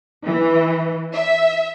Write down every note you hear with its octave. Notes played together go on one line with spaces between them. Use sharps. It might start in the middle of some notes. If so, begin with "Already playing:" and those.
E3
E5